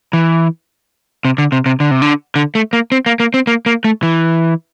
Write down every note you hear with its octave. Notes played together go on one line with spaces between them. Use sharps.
E3
C3
D3
C3
C3
D3
C3
D3
D3
A3
A#3
C4
A#3
A#3
C4
A#3
A#3
A3
E3